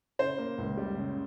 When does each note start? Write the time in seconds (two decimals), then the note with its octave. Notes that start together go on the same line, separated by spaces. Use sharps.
0.19 C#3 C5
0.38 A#3
0.58 C#2
0.77 G3
0.97 C#3